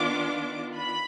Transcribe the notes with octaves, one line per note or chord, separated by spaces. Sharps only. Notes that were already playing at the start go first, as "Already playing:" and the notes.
Already playing: D#3 B3 D4 F4 D6
B5